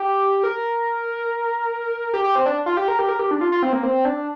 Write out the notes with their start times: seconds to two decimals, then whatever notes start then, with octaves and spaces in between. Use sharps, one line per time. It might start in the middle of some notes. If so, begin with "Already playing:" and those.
Already playing: G4
0.44 A#4
2.14 G4
2.24 G4
2.35 C4
2.46 D4
2.66 F4
2.77 G4
2.88 A#4
2.99 G4
3.09 A#4
3.19 G4
3.31 D4
3.41 F4
3.52 F4
3.63 C4
3.73 A#3
3.83 C4
4.05 D4